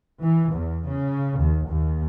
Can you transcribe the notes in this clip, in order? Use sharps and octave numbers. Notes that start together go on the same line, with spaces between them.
E3
E2
C#3
D#2
D#2